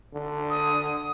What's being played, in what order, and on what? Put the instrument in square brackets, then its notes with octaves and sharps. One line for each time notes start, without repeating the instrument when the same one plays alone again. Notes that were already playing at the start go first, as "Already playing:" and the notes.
[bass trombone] D3
[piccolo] D#6